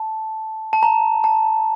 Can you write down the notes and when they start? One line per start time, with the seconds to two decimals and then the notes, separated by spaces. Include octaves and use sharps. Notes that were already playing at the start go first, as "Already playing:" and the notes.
Already playing: A5
0.73 A5
0.83 A#5
1.24 A5